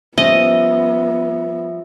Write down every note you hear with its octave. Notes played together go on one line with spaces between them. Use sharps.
F3 G3 B3 C#4 D#5 E5 A#6